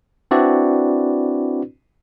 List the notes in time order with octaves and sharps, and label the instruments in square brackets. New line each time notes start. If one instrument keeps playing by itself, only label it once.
[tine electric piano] C4 D4 E4 F#4 B4 D5